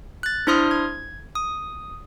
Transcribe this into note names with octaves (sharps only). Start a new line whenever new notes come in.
F#6 A6
D4 E4 C5 C6 D#6 F6
G#6
D#6